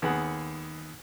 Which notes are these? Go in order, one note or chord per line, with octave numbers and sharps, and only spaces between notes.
D#2 B3 G#4 F#5